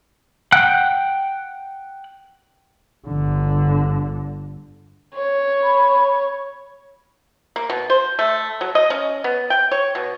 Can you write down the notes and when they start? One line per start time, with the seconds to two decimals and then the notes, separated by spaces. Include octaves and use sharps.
0.52 F#5 G5 F#6
3.08 G1 D3
5.14 C#5
5.63 B5
7.56 A#3
7.70 B2
7.90 C5
8.19 A3
8.61 F#3
8.75 D#5
8.90 C#4
9.24 B3
9.50 G5
9.71 C#5
9.95 B2